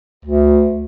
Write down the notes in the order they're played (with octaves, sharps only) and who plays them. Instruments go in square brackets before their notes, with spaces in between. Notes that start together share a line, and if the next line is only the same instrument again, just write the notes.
[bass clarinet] D2